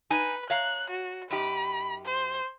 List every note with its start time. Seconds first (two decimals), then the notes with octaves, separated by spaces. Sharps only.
0.10 D#4 B4 G#5
0.50 C#5 F5 A#5 F#6
0.90 F#4
1.30 F#2 D#4 G4 B5
2.05 C5